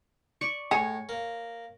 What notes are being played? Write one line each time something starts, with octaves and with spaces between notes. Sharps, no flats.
D5 C#6
A2 G#4 C#5
A#3